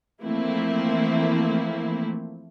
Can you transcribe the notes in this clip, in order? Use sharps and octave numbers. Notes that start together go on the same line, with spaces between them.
E3 F3 A3 A#3 C4 E4